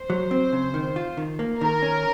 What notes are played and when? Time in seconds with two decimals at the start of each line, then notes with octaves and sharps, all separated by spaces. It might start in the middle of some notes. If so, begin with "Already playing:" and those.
Already playing: C5
0.10 F#3
0.31 C4
0.52 C#3
0.74 D#3
0.96 F4
1.17 D#3
1.39 A#3
1.61 D#3 A#4
1.82 C#4